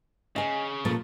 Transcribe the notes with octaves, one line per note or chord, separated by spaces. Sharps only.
C#3 D#5 G#5
A#2 F3 A3